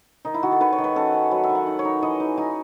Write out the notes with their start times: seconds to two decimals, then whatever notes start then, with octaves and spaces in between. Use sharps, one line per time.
0.25 D#3 D#4
0.34 E4
0.43 D#3 F#4
0.52 A4
0.60 D#3 B4
0.73 C#5
0.78 D#3
0.84 B4
0.96 C#4 A4
1.14 C#4
1.31 F#3 B4
1.43 E5
1.49 D#3
1.55 F#5
1.67 D#4
1.79 C#5
1.85 D#4
2.02 E3 D#5
2.20 D#4
2.38 D#4 G#5